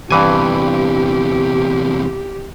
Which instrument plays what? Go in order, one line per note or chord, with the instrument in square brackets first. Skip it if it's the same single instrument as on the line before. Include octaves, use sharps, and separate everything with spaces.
[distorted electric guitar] E2 C3 [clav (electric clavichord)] G2 E3 G#5 [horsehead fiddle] G4